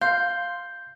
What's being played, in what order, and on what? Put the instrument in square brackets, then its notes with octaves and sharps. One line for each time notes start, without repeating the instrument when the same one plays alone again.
[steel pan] F5 [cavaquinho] C6 [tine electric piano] G6